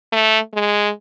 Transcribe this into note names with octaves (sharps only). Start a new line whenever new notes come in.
A3
G#3